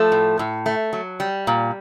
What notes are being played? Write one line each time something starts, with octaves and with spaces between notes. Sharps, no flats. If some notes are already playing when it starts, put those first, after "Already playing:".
Already playing: F3 A3 A4
A2
A2
A3
F#3
G3
A#2